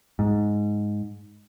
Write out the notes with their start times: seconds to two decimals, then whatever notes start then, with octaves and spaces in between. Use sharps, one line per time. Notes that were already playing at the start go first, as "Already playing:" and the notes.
0.19 G#2